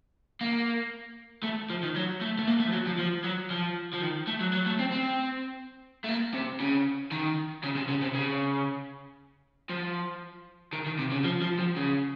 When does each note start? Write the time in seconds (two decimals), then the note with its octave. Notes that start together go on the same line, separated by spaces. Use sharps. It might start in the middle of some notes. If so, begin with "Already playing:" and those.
0.41 A#3
1.44 A3
1.70 F3
1.83 D#3
1.96 F#3
2.21 A3
2.39 A3
2.47 A#3
2.60 A3
2.67 F3
2.73 F#3
2.86 F3
2.99 F3
3.24 F#3
3.50 F3
3.94 F3
4.02 D#3
4.28 A3
4.41 F#3
4.53 F#3
4.66 A3
4.79 C4
4.92 C4
6.04 A3
6.09 A#3
6.34 C3
6.60 C#3
7.11 D#3
7.63 C#3
7.76 C3
7.89 C#3
8.02 C3
8.15 C#3
9.70 F3
10.73 D#3
10.86 D#3
10.99 C3
11.12 C#3
11.25 F3
11.42 F3
11.59 F3
11.76 C#3